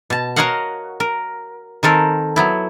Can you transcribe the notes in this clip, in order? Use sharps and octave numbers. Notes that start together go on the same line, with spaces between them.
B2 A5
F#4 A#4 C#5 D#5 F5 F#5
A#4
D#3 C4 A4 A#4
F#3 B3 E4